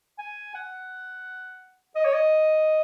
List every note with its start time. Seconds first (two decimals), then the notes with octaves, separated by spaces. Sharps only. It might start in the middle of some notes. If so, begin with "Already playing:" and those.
0.19 G#5
0.55 F#5
1.95 D#5
2.05 C#5
2.14 D#5